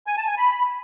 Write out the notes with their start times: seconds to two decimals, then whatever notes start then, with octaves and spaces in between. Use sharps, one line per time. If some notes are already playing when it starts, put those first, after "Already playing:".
0.07 G#5
0.17 A5
0.27 G#5
0.37 B5